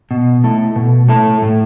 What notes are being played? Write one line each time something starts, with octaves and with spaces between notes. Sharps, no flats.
B2
A3 E4 A4
B2
A3 E4 A4
A2